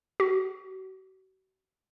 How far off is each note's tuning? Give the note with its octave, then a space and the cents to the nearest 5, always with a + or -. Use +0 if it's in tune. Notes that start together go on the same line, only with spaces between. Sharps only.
F#4 +40